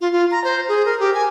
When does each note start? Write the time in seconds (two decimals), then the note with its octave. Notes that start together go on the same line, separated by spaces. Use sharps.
0.01 F4
0.12 F4
0.31 A#5
0.44 C5
0.68 G#4
0.86 A#4
1.00 G4
1.14 G#5